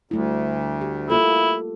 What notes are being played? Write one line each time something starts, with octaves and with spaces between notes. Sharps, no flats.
D2 G3 A3 E4
G4
A#3 E4 F4 A4